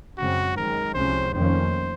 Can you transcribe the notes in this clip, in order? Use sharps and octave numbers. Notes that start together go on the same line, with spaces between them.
F#2 C#3 G#3 C4 F#4
F#2 D#3 G#3 A#4
C2 C3 F3 G#3 C#4 C5
F1 F2 D#3 A#3 C#4 C5